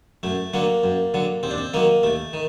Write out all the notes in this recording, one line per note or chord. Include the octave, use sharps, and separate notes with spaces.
F#2 A3
D3 F#3 A#3
F#2
D3 F#3
D#2 C4
D4
C4
D#3 F#3 A#3
D#2 A3
D#3